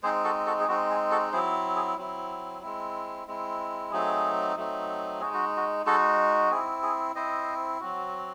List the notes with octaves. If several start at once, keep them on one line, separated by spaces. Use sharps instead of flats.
G#3 C4 D#4 G#4 C5
F#4 A4
F#4 A4
G#4
G#3 C4 D#4 F#4
G#4
F#4 A4
F#3 C4 E4 G#4 C5
G#4
F#3 C4 E4
G#3 C4 E4
G#3 C4 E4
F#3 A3 C4 D#4 G#4
F#3 A3 C4 D#4
G#3 D#4 F#4 G#4
F#4
F#4
G#3 D#4 F#4 A4
C4 E4 G#4
G#4
C4 E4 C5 D#5
F#3 C4 F#4